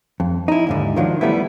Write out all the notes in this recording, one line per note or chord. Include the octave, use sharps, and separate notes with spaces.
F2
D#4 E4
D#2 G#2 D3
D#3 F3 F#3 D4
G3 A3 B3 E4